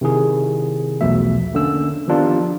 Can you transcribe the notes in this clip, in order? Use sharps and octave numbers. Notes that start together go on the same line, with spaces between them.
C3 D#3 E4 G#4
B1 E2 B2 F3 A3 E5
D3 A#3 C#4 E6
D#3 F3 B3 D4 F4 G4